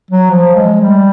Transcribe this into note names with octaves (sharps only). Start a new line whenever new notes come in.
F#3
F3
G#3
G3